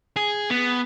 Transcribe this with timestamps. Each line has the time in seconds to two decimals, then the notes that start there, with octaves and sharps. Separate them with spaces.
0.16 G#4
0.50 B3